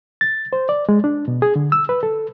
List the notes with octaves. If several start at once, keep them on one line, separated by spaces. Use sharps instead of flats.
A6
C5
D5
G#3
D4
B2
G#4
D3
E6
B4
A4